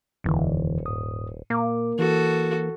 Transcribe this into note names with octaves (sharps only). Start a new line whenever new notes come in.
D#1 F2 D3 E3
G#2 D#6
A#2 A#3 D6
E3 F#4 A4